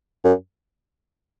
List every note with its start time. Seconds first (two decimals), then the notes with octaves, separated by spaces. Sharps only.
0.25 F#2